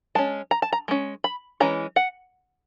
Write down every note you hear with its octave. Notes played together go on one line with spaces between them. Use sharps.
G#3 C#4 A5
A#5
A5
A#5
G#3 C#4
B5
E3 G#3 C#4 A#5
F#5